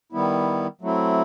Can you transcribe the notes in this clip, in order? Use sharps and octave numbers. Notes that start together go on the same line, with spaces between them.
D#3 G3 B3 E4
F#3 A3 C4 E4